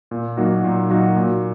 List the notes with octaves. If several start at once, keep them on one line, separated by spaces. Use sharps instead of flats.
A#2
F#3 A#3 D#4 F#4
A#2
F#3 A#3 D#4 F#4
A#2